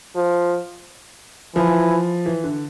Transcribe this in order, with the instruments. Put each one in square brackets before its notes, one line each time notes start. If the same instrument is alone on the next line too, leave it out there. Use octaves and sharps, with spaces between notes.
[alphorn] F3
[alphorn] E3 [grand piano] F3
[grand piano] E3
D3